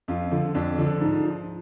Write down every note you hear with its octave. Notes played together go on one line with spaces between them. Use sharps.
F2 F4
D3 F3
F2 D4
D3 F3
G#2
F3